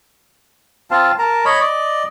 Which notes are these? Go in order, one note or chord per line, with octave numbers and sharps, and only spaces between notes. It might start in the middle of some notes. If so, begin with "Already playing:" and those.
C4 F4 F5 A5
A#4 A5 A#5
C#5 D#5 B5
D5 D#5